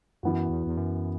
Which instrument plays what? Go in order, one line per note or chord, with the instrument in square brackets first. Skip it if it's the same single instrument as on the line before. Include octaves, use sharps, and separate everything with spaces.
[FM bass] F#2 [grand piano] E3 B3 F#4
[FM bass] E2
E2
F#2